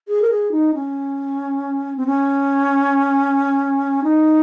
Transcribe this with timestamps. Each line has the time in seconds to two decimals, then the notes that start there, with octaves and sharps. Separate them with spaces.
0.08 G#4
0.22 A#4
0.30 G#4
0.51 D#4
0.74 C#4
1.97 C4
2.06 C#4
4.04 D#4